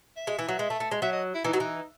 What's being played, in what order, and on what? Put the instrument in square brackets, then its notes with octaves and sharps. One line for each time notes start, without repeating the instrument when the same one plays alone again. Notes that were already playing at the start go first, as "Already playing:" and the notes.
[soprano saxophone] E5
[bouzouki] G#3
E3
F#3
G#3
A3
A3
G#3
[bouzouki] F#3 [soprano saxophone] E5
[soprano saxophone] D#5
E4
[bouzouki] E3 [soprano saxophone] D#4
[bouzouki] F#3
E3